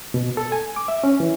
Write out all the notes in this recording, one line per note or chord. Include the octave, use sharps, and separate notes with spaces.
B2
A4
G#5
D6
E5
C#4
E3